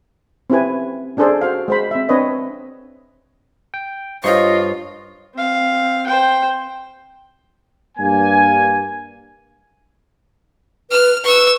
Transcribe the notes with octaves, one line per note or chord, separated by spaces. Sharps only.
C4 C#4 E4 G4 B4 G#5
C#4 D4 G#4 A4 C5 D5
F#4 C5 F5
G#3 C5 B5
C4 E5
C4 D4 B4 C#5 D#5
G5
G2 F4 C5 C#5 D#5 C#6
C4 F5
C5 G5
G2 A#3 G#5
B4 F6
B4 C#6 E6